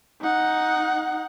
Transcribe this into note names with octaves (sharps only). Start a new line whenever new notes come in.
D#4 F#5